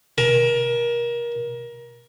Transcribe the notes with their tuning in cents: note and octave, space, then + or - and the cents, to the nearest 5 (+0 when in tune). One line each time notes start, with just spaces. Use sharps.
A#4 +25 A5 -15